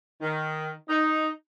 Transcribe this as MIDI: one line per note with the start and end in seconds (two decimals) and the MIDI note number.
0.22 0.72 51
0.88 1.27 63